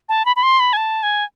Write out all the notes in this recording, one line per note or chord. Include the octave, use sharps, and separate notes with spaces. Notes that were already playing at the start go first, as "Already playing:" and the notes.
A5
B5
B5
C6
B5
G#5
A5
G#5